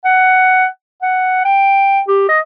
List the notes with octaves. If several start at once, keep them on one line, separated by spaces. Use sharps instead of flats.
F#5
F#5
G5
G4
D#5